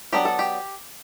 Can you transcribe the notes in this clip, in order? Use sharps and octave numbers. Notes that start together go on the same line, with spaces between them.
F#3 B3 D4 G4
A4
G4